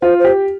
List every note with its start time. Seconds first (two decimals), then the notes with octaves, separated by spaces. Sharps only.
0.02 F4 C5
0.19 C5
0.24 G4